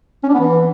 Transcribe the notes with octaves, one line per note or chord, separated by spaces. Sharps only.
C#4
D4
B3
E3